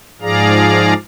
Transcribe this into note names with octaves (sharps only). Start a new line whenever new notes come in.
G#2 F3 G#4 D5 F5 A#5